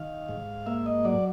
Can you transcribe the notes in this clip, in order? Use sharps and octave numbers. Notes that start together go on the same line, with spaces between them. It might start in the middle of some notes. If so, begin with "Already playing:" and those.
Already playing: D#3 F5
G#2
A#3 E5
D#5
F#3 D5